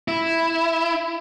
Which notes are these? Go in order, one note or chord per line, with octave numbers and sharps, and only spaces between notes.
E4